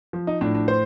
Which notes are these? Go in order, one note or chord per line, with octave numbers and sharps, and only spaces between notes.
F3
D#4
A2 D4
D4
C5